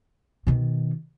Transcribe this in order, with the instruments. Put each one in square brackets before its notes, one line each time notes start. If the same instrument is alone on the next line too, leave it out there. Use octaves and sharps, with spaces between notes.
[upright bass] B2 D#3